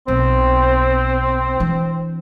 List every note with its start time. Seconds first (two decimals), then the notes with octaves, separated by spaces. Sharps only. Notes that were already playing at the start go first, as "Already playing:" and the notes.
0.08 B1 B2 C4
1.60 E3 D4